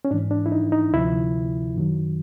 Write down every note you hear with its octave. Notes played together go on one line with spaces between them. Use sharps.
C#4
G#2 E3 D4
D4
E4
D#4
D#4
D2 C3 F3 E4
F#2 D#3 F#3